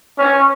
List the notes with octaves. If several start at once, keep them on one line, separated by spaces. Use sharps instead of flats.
C#4